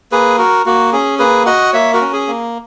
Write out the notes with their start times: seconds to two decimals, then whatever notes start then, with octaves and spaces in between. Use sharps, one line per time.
0.12 A#3 G#4 B4
0.38 F#4 A#4
0.66 A#3 F#4
0.93 C#4 G#4
1.19 A#3 G#4 B4
1.46 F#4 D#5 F#5
1.73 A#3 C#5 E5
1.93 F#4 A#4
2.01 C#4
2.13 G#4
2.27 A#3